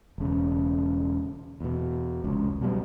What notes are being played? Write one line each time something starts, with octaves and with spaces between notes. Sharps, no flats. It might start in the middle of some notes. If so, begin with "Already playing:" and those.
E1 C#3
E2 B2
F1 C#2
B2 F#3 G3